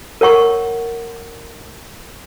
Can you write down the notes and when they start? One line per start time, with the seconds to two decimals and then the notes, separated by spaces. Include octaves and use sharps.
0.21 A#4 C#5 F#5 C#6